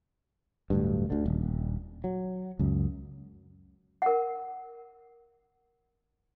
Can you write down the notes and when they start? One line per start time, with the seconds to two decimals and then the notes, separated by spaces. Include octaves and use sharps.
0.70 D1 D2 G2
1.10 D2 D3
1.26 D#1
2.04 F#3
2.59 C#2 F#2
4.02 A#4 F#5